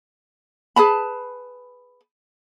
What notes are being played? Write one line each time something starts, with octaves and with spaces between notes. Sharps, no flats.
G#4 B4 A5 B5